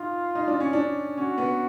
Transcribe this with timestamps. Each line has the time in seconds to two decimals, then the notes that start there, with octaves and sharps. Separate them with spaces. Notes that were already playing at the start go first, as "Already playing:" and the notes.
Already playing: D#4 F4
0.35 D#4
0.48 D4
0.60 C#4
0.73 D4
1.17 C#4 F#4
1.38 B3